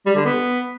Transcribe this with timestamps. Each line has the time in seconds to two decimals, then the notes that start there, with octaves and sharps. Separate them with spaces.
0.06 G3
0.16 D3
0.25 B3